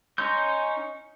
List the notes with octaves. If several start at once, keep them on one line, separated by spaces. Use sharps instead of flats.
C#4 D#4 C#5 C6 G6